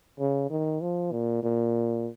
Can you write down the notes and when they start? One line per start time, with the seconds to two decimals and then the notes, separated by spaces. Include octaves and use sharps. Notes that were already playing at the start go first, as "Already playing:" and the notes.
0.20 C#3
0.50 D#3
0.81 F3
1.12 A#2
1.43 A#2